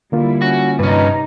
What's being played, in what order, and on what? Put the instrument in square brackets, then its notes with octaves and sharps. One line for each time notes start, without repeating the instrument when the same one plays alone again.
[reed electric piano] D3 A#3 F4 [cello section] G3 E4
[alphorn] C#4 [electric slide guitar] F#4
[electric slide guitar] G2 C#4 [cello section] C3 D#4 [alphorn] B4